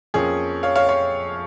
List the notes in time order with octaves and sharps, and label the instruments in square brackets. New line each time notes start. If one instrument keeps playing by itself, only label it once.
[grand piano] F2 F3 A#3 C#4 G#4 C#5
C#5 F5
C#5 F5
C#5 F5